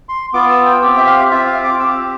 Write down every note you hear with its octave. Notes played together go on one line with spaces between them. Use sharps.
C6
B3 F4 D6
E6
G5
C4 G4 G5
E5
F5
C4 F4 E5
F5
D6
C4 G4 E6